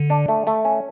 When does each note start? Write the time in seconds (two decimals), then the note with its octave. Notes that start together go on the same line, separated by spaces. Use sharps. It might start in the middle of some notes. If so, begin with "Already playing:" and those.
Already playing: D3
0.10 D4
0.28 A3
0.47 A3
0.65 C#4